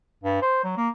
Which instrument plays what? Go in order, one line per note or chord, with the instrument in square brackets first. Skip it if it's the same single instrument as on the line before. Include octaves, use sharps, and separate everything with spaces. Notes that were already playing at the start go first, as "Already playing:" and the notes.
[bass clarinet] G2
C5
F#3
A#3